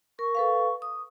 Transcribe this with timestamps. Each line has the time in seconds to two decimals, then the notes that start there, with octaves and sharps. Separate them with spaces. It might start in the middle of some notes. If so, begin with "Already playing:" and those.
0.19 A#4 C#6
0.35 A4 B4 F5
0.82 D#6